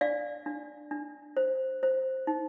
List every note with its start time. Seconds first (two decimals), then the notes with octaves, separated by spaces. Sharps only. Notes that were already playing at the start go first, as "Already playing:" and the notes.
0.01 D4 D5 F5
0.46 D4
0.91 D4
1.37 C5
1.83 C5
2.27 D#4